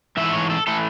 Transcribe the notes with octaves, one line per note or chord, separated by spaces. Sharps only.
G#2 E3 A3 E5
C#5
A4
E3 A3 A4